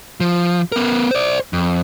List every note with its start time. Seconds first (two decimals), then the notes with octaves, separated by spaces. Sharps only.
0.20 F3
0.72 B3 A#4
1.11 C5 D5
1.53 F2